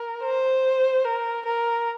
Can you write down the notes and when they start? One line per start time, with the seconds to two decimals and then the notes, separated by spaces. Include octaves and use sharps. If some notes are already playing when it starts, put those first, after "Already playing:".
Already playing: A#4
0.22 C5
1.04 A#4
1.45 A#4